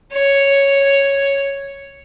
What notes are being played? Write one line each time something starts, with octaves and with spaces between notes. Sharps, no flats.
C#5